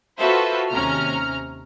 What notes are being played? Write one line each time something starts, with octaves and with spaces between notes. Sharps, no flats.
F4 F#4 A4 B4 C5 E5
D#2 C3 C#4 A#5 F6